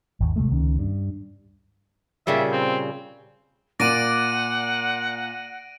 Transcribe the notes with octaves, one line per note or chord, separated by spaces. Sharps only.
G#1 D#2
C3 G#3 A3
C#2 D#3 C#4
G2
A#2 C#3 G3 E5
C4
A#2 A#3 D5 F#5 A#6 D7 D#7